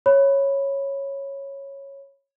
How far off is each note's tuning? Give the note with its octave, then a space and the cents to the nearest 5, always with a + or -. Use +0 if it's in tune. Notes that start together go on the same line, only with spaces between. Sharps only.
C#5 -10 B5 +0